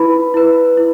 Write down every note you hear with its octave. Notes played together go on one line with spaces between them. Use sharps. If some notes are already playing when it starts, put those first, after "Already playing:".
Already playing: E4 B4 B5
E4 B4
E4